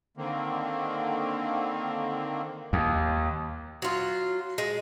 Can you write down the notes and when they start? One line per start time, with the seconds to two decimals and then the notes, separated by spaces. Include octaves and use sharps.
0.17 D3 D#3 A#3 C4
2.73 D#2
3.82 F#3 F4
4.58 G#3